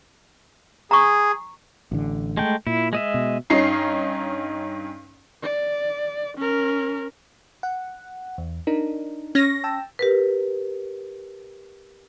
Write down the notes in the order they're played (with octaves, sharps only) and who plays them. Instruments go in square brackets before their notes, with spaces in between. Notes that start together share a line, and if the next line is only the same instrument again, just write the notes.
[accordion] G#4 [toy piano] A#5 C#6
[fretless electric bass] A1 D3
[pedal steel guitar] G#3 A3 G5
[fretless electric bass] A#2 [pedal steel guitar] E4
[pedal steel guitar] G#3 D#5 E5
[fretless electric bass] B2
[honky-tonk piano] G2 C#4 D#4 C7
[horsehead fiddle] D5
C#4 A#4
[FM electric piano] F#5
E2
D4 D#4 A#4
[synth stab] C#4 A#6
[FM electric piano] G5 A5 E6
[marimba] G4 A#4 B4